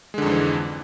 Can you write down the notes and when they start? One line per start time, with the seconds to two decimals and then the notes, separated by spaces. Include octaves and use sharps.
0.14 G#3
0.18 D3
0.22 F2
0.26 G#2
0.30 E3